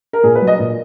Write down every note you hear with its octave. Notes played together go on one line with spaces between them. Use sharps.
A#4
A#2 G#4
B4
F#3
D#5
A#2